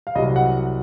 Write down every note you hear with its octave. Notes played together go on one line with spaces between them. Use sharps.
F5
C2 C3 F#3 D#5
F#5